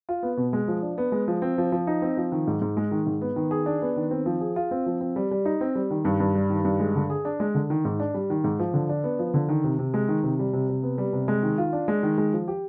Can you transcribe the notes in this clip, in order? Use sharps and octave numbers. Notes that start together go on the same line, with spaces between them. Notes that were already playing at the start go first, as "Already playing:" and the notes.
F4
B3
B2
G#3
F3
D4
B3
G#3
F3
C4
F3
F3
D#4
C4
F3
D#3
G#2
G#2
G#3
D#3
G#2
B3
D#3
G#4
D4
B3
D#3
C4
F3
G#4
F4
C4
F3
C4
G3
G3
D#4
C4
G3
D#3
G2
G2
G3
D#3
G2
G#3
D3
G#4
D4
G#3
D3
D#3
G#2
D4
G3
D#3
G#2
F3
D3
D4
B3
F3
D3
D#3
C3
C3
G#3
D#3
C3
G3
C3
C3
B3
G3
C3
G#3
D#3
F4
D4
G#3
D#3
G#3
F3
G4